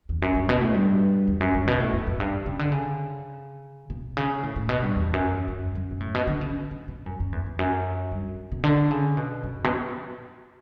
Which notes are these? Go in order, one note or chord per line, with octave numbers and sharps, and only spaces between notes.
E2
F#2
G2
B2
A2
G2
E2
F#2
G2
B2
A2
F#2
F#2
G2
C#3
D3
C#3
B2
C#3
A2
A2
B2
G2
E2
F#2
F#2
F#2
B2
A2
B2
D3
C#3
C#3
B2
F#2
F#2
E2
E2
F#2
G2
B2
D3
C#3
B2
F#2
B2